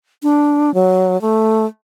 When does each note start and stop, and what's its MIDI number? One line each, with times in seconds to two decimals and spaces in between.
0.23 0.74 62
0.74 1.20 54
1.21 1.66 57